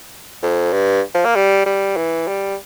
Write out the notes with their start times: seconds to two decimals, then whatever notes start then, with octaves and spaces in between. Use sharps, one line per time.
0.43 F2
0.73 G2
1.14 F3
1.25 A#3
1.35 G3
1.66 G3
1.97 E3
2.28 G3